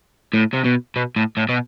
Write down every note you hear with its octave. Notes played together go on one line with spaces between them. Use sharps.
A2
C3
B2
B2
A2
A2
B2